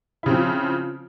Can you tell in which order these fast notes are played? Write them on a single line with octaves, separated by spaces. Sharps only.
E4 C#3 C4 F3